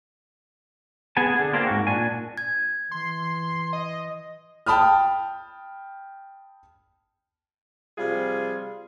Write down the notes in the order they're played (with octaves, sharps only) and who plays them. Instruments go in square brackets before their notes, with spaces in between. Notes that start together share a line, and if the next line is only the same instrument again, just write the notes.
[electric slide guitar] B3 G#4 F#5 G#5 A5
D3 G#4
A#3 C4 D4 F4
G#2 F#4
A#2 D4 G#5
[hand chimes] G#6
[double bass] E3 [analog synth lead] C6
[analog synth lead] D#5
[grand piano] G5 A5 B5 D#6 F6
[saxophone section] C3 F3 G3 F4 G#4